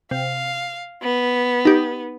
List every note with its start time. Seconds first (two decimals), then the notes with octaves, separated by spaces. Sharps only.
0.11 C3 F5
1.03 B3
1.65 D#4 G4